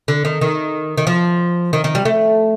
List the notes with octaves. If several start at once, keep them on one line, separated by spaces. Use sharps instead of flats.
D3
D#3
D#3
D#3
F3
D#3
D#3
G3
A3